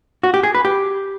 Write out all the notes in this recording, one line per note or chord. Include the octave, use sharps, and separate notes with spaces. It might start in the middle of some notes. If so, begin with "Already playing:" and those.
F#4
G4
G#4
B4
G4